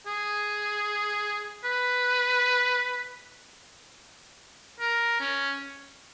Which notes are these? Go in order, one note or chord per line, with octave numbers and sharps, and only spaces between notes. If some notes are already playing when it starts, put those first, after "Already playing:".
G#4
B4
A#4
C#4